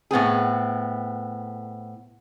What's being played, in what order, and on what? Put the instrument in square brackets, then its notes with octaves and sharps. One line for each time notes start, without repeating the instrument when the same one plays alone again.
[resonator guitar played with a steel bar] A2 B3 C4 G#4